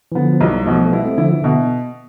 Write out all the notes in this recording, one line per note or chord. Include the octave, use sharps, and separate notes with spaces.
E3
D3 F3 B3
F3
B1 E3 G3
B2 F3 A3
A3
G3 B3 E4
A3 C4
D3 F3 E4
E3
B2 D3